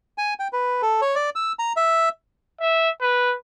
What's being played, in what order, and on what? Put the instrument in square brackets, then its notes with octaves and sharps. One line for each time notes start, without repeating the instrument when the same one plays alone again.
[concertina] G#5
G5
B4
A4
C#5
D5
E6
A#5
E5
[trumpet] E5
B4